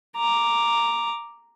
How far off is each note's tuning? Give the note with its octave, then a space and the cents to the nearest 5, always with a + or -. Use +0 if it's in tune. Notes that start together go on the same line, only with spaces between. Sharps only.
A#5 +0 D6 +0